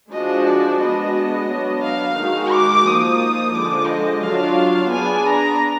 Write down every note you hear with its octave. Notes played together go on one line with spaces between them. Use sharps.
F3 G#3 D4 F#4 D#5
D5
G#3 B3 D4 F#4 D#5
F#3 B3 D4
F5
D#3 G#3 D#4 F#4
D6
F3 A#3 D#4 D#6
D3 F3 G#3 D4 D6
D#5
F#3 D4 F4 F5
B3 D4 G#4 D5 G#5
A#5